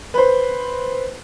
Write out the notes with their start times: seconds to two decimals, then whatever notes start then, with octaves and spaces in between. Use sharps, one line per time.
0.14 B4 C5